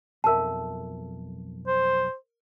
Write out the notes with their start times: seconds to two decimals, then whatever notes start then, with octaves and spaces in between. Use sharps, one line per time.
0.24 B1 F2 A#4 E5 A5
1.67 C5